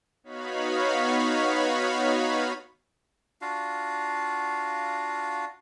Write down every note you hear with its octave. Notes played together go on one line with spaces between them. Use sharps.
B3 D#4 F#4 C#5 F5 B5
D4 F4 F#4 F5